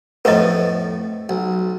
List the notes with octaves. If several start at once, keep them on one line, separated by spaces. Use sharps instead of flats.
F2 A2 B3 B4 D#5
B1